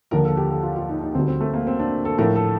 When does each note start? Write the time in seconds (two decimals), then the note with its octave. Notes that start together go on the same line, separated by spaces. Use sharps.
0.11 D#2 D3 F3 A#4
0.25 A4
0.37 G4
0.51 A4
0.63 F4
0.76 F4
0.89 D#4
1.01 D#4
1.15 D2 D3 G3 C4
1.28 C4
1.41 A3
1.54 A#3
1.67 C4
1.79 D4
2.05 A4
2.18 A2 F3 A3 A#4
2.36 A4